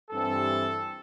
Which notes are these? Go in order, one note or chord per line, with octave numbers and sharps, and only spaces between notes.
G2 E3 G3 C4 A4